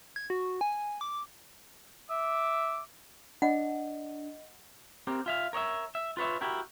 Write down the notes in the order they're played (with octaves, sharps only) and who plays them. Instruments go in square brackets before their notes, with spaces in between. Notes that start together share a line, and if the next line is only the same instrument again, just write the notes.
[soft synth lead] G#6
F#4
G#5
D6
[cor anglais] E5 [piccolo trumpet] D6
[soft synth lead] D4 [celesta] D#5 [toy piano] F#5
[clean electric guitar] C4 G4 A#4
F4 E5 F5
A#4 C#5 D#5 E5
E5
F4 B4 C#5 E5
E4 F#4 G4 A#4